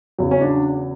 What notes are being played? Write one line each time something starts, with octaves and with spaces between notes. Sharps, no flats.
E2 C#3 F#3
C#4
D4